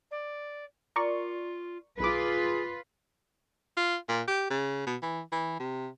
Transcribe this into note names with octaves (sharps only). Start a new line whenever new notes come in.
D5
F4 A#4 D5 C#6
B1 F4 G#4 B4 D6
F4
A#2
G4
C#3
B2
E3
E3
C3